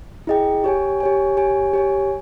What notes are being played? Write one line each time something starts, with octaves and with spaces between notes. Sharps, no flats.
E4 G#4 D#5 G5
G4 C#5 G#5
G4 C#5 G#5
G4 C#5 G#5
G4 C#5 G#5